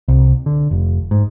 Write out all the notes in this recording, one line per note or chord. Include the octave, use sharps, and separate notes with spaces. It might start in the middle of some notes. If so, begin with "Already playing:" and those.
C2
D3
F1
G#2